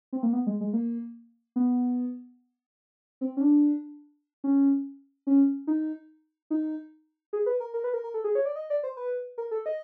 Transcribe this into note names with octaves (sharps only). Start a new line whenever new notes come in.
C4
A#3
B3
G#3
G#3
A#3
B3
C4
C#4
D4
C#4
C#4
D#4
D#4
G#4
B4
A#4
A#4
B4
A#4
A#4
A4
G#4
C#5
D5
D#5
D5
C5
B4
A#4
A4
D#5